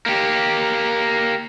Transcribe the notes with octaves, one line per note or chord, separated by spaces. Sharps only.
A#3 G4